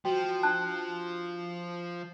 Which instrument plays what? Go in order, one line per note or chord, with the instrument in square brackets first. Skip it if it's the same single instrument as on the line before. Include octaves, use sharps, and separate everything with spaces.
[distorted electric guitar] F3 [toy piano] F#4 G5
[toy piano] D4 [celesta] A5 F#6